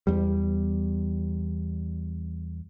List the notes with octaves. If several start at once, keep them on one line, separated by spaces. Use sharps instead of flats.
E2 G3